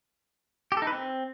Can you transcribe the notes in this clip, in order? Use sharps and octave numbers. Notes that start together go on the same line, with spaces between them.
G4
A4
D#4
B4
C4